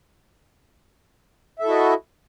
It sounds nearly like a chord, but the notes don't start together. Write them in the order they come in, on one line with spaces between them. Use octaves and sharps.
E5 A4 E4 F#4 D#5